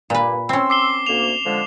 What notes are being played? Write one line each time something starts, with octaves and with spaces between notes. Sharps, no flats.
G2 A#2 A#3 B4
C4 C#4 C6 E6
D6 C7 G7
D2 A#3 E7 F7
D3 F3 G#3